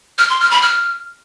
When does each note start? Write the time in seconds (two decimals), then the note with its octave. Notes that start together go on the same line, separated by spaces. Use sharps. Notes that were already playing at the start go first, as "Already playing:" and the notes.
0.19 F6
0.29 C6
0.40 F6
0.51 B5
0.62 F6